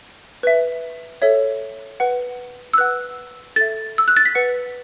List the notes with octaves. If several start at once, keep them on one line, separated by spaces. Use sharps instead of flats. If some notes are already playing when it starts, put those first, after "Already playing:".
B4 E5
A4 C#5 E5
B4 F#5
E6
B4 F#5 F#6
A4 E5 A6
E6
F#6
A6
B6
B4 F#5 C#7